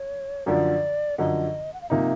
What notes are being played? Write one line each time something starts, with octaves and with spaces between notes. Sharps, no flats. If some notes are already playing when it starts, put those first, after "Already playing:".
Already playing: C#5
F#2 D3 F3 D5
F#2 D3 F3 D#5
F#5
F5
C3 F3 A#3 D#4 E5